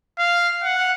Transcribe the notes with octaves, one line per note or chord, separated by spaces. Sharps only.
F5
F#5